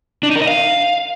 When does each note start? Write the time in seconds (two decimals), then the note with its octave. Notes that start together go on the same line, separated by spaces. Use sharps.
0.23 D4
0.29 D#4
0.36 A#4
0.42 D#5
0.48 F5